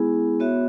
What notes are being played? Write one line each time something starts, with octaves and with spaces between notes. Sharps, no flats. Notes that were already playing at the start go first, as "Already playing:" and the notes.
Already playing: G#3 B3 E4 G#4
B3 F#4 C#5 E5